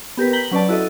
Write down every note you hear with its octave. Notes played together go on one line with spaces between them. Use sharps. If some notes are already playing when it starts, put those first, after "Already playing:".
B3 G4 A#4 B4
A#5 G6 B6 F#7 G7
F#3 C#4 B4 D5 A5
E4 F#4 A4 D#5